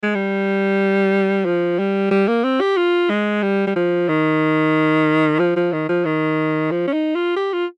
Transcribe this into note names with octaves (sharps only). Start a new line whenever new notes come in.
G#3
G3
F3
G3
G3
A#3
C4
G4
F4
G#3
G3
G3
F3
D#3
F3
F3
D#3
F3
D#3
F3
C#4
D#4
F4
G4
F4